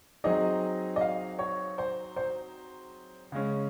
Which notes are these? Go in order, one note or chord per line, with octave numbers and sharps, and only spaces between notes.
F#3 C4 D#4 G#4 D#5
D#5
F5
C#5
C5
C5
C#3 G#3 C#4